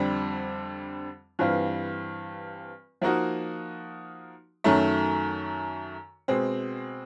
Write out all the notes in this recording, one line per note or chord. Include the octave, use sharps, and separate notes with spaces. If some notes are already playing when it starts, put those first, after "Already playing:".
Already playing: F2 D3 G3 C4
G2 E3 G3 C4 F4
F3 A#3 D#4 F#4
F#2 D#3 F#3 A3
B2 G#3 C4